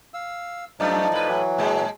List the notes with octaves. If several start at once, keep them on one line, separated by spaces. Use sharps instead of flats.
F5 E6
F#2 F3 A3 D#4 D5
A2 B4
E3 F#3
A#2 G#3